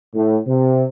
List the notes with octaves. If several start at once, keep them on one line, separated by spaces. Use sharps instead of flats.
A2
C3